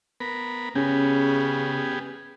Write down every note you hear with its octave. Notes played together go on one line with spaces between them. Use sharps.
B3 A#4 B5
C#3 B3 C#4 G4 G#4